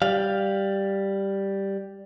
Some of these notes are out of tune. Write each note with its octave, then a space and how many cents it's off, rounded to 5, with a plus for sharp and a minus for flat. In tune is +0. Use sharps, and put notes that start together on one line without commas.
G3 +0 F5 +0